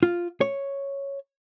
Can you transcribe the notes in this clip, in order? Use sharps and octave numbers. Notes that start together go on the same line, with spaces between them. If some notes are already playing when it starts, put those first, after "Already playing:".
F4
C#5